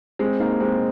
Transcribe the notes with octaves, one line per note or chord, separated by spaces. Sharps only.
G#3 C4
A#3 D#4
G#3 C4